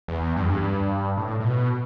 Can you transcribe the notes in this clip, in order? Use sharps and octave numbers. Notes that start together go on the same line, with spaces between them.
E2
G2
E2
G2
A2
A2
B2